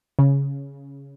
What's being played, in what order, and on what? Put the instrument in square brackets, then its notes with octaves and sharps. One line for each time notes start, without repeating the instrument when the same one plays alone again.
[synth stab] C#3